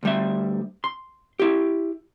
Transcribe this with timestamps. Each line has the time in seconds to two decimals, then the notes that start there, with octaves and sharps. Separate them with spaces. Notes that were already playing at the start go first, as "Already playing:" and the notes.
0.03 D2 G3 E5
0.84 C6
1.40 E4 G4